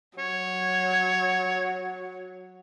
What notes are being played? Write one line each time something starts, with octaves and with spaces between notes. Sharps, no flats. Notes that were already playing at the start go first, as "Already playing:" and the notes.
F#3 C#5